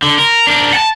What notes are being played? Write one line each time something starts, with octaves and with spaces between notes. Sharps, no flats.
D3
A#4
D4 A#4
F#5 A5